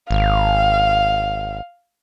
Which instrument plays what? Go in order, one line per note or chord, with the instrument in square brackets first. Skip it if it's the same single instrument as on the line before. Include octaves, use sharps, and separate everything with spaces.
[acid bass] G#1 [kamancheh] F5